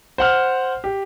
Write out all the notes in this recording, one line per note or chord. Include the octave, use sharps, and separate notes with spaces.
C5 F#5 F6
G4